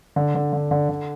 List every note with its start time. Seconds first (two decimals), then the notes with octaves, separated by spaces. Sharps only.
0.16 D3
0.35 D3
0.53 D3
0.71 D3
0.89 D3